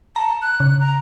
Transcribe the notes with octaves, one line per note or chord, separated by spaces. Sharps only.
A5 A#5
F#6
C#3
A#5